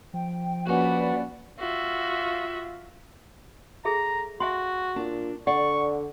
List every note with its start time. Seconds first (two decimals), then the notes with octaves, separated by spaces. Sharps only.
0.14 F3 G5
0.67 A#1 C#4 F#4 B4 D5
1.59 F4 F#4 E5
3.85 G#4 A4 E5 A#5
4.40 F#4 E5 F5 G#5 C6
4.96 A#2 D4
5.47 D3 D5 F#5 C#6